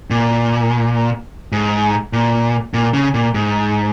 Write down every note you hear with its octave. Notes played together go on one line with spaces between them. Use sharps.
A#2
G#2
A#2
A#2
C#3
A#2
G#2